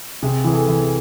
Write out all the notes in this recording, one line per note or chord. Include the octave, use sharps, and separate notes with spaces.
C3 G#4
E3 G#4
A4
E3
G#4